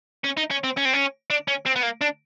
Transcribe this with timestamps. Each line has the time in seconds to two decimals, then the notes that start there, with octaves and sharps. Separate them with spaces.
0.24 C#4
0.37 D#4
0.51 C#4
0.64 C4
0.77 C#4
0.85 C4
0.93 C#4
1.30 D4
1.48 C#4
1.66 C4
1.76 B3
1.83 A#3
2.01 D4